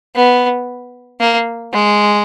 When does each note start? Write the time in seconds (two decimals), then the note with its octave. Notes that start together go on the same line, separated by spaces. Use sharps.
0.15 B3
1.20 A#3
1.73 G#3